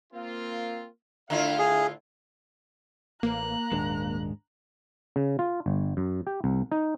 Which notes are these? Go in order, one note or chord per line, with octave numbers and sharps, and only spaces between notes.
A#3 C4 F4
A2 D3 E4 F4 E5 F5
G#4
A1 A#3 A#5 F#6
D#1 G#2 D#3 G#3 D4
C#3
F4
G1
F#2
G4
C2
D#4